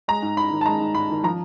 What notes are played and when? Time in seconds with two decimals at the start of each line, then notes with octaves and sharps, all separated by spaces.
0.08 G#3 A#5
0.22 G#2
0.37 G#2 B5
0.51 D#3
0.61 A5
0.66 G#3 A#5
0.81 G#2
0.94 G#2 B5
1.10 D#3
1.23 F3 A#5